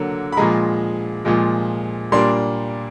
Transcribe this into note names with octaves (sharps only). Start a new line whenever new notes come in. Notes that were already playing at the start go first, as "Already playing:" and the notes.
Already playing: D3 F#3 A#3
B5
A#2 F3 G#3 A#5
A#2 F3 G#3
A#2 G3 A#3 D4 C6